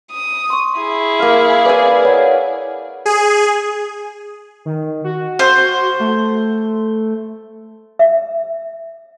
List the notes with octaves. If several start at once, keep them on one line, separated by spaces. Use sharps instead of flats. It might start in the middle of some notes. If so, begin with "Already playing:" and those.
D#6
C6 C#6
E4 G#4
A#3 F5
B4 D5 G#5
C#5 F#5
G#4
D#3
F#4
C5
A3
E5